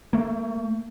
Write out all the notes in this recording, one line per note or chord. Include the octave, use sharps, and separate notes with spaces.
A3 A#3